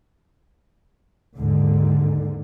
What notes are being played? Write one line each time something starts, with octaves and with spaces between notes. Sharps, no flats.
D#2 G#2 D3